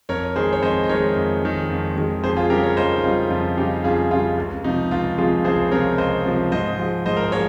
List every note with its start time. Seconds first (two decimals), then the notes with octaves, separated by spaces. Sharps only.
0.09 F2 A#4 C#5
0.36 D#3 G#3 G#4 C5
0.53 C#5
0.62 F2 C5 D#5
0.84 D#5
0.89 D#3 G#3 A#4 C#5
1.16 F2
1.43 D#3 G#3
1.70 F2
1.97 D#3 G#3
2.24 F2 G#4 C5
2.37 F4 G#4
2.50 C#3 G3 G4 A#4
2.63 A#4 C#5
2.77 F2 C5 D#5
2.96 D#4
3.03 C#3 G3 F4
3.30 F2 F4
3.57 C#3 G3 D#4 G4
3.84 F2 F4 G#4
4.11 C#3 F4
4.15 G3
4.37 C#2
4.64 C3 F3 D#4
4.91 C#2 F4
5.18 C3 F3 F4 G#4
5.45 C#2 G#4 C5
5.71 C3 F3 A#4 C#5
5.98 C#2 C5 D#5
6.26 C3 F3
6.52 G#2 C5 D#5
6.79 F3 G#3
7.06 G#2 C5 D#5
7.17 A#4
7.25 C5
7.32 F3 G#3 A#4 C#5